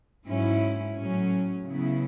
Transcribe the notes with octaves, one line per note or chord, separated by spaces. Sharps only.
G#2 F#3 C#4 E4
A2 F#3 C#4
C#3 F#3 B3 E4